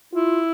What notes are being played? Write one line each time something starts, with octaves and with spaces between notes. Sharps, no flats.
E4 F4